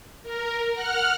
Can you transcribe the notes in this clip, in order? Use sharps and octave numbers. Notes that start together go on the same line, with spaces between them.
A#4
F#5 F6 F#6